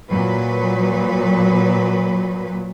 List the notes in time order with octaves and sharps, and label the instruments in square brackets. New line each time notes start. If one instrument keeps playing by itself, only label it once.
[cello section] A#2 F#3 B4